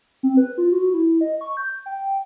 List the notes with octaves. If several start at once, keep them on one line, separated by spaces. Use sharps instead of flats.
C4
B4
F4
F#4
E4
D#5
C#6
G6
G5